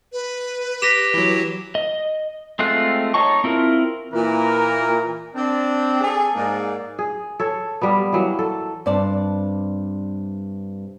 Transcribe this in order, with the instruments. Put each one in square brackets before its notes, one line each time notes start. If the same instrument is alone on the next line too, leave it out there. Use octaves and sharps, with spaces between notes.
[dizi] B4
[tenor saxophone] G4 [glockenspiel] A#6 B6 E7
[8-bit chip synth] E3 F#3
[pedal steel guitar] D#5
G#3 A3 C4 F4 F#6
D#4 C#5 D#5 A5 C#6
C4 E4 F4 A#4
[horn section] A#2 E3 A#4
C4 D4
G#4 A4
G#2 A#3 D5
[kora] G#4
A4 C#5
G3 A#3 B3
E3 F#3 A#3
A4
[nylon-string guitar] G2 C3 C5 D5 A5